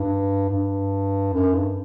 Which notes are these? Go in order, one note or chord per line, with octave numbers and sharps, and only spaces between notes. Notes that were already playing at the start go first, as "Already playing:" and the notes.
Already playing: G2
G2
F#2
G2